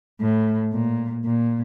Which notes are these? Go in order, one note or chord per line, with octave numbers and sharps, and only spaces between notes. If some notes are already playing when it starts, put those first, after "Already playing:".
A2
A#2
A#2